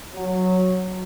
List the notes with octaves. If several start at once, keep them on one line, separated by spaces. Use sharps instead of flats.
F#3